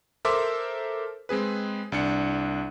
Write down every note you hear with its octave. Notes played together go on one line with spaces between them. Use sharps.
A4 A#4 C5 E5 C6 D6
G#3 C4 G#4 B4
C2 D4 C#7